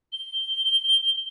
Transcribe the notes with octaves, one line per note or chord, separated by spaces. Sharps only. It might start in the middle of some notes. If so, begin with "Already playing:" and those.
G7